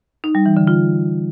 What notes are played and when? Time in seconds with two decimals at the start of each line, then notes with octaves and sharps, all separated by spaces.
0.24 D#4
0.35 G3
0.46 E3
0.57 D3
0.67 F4